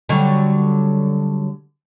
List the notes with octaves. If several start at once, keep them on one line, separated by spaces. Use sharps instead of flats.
D3 F#3 G3